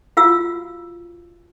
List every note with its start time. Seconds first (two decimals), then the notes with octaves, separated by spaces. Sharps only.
0.17 F4 F#4 F5 E6